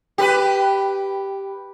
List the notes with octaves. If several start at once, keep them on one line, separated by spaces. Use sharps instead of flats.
G4 A#4 B4